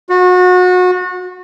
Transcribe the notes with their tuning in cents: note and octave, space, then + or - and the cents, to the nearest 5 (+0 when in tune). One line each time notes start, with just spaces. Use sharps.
F#4 -30